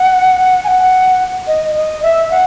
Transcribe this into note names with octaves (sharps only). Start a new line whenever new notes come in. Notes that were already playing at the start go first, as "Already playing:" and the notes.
Already playing: F#5
G#5
F#5
D#5
D#5
E5
F#5